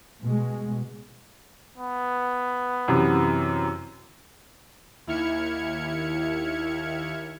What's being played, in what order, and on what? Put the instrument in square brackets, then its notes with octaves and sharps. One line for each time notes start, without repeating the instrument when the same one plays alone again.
[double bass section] B2 G#3
[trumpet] B3
[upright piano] F#2 C3 E3
[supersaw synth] D#2 E4 F6 G#6 C#7